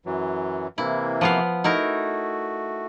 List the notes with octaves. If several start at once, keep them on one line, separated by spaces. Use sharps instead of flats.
F#2 E3 F#3
C3 E3 A#3 E4
F3 B3 F5
A3 D#4 E4 F#4 A#4